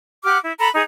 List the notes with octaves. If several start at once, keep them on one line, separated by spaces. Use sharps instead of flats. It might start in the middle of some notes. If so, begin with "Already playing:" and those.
G4 F#5 D6 F6
E4
A4 A#5 B5
D#4 G#4